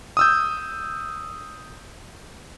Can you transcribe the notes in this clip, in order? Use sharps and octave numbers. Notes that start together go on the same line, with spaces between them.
D#6 E6 G6